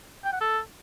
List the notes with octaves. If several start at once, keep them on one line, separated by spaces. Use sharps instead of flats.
G5
F#5
A4